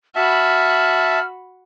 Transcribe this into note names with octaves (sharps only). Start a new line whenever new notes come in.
F#4 E5 A5 B5 F6